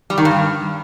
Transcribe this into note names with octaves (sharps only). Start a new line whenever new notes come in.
G3
D#3
G2